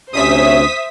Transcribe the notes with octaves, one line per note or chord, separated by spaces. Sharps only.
D2 C3 C#4 C5 E5 D#6 B6